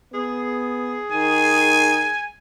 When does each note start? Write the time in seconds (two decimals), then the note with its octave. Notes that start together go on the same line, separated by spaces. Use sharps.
0.14 B3 G#4
1.12 D#3 G#5